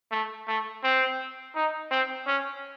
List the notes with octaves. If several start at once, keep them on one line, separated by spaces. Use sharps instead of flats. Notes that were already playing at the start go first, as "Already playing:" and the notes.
A3
A3
C4
D#4
C4
C#4